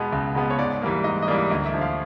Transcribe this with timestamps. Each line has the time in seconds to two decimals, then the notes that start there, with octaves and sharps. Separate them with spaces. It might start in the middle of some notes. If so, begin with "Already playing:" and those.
Already playing: B2 G#3 B3
0.13 C#2
0.35 B2 G#3 B3
0.50 C#5
0.58 G#2 D5
0.82 E3 G3 A#3
1.04 G#2 D#5
1.22 D#5
1.28 E3 G3 A#3 D5
1.51 D2 D#5
1.66 E5
1.74 D3 F3
1.81 F5